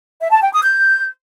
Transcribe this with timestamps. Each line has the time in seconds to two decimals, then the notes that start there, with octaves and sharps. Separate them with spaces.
0.20 E5
0.31 A5
0.42 G5
0.53 D#6
0.64 G6